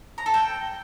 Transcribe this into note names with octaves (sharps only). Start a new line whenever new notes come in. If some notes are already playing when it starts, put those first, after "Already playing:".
A#5
A4
G5